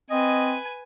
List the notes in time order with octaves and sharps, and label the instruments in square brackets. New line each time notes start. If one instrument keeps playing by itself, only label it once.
[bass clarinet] C4 [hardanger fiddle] B4 G#5 [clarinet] D#5